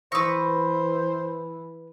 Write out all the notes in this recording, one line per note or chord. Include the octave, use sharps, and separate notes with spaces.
E3 B4 C5 C#6 D#6 E6 A#6